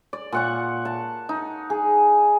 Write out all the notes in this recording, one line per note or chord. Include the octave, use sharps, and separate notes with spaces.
D5
A#2 F#5 C#6
A5
D#4
G#4